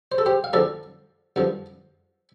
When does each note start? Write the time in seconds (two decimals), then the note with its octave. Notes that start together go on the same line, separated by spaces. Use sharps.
0.12 C5
0.18 A4
0.26 G4 C5
0.44 F5
0.53 D2 D3 F3 A4 D5
1.36 G2 D3 F3